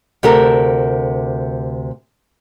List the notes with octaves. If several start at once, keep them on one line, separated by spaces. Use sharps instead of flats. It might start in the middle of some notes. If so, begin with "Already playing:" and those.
D2 C3 G4 A4 A#4